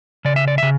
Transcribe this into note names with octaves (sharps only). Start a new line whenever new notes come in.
C#3 D5
E5
D5
C#3 E5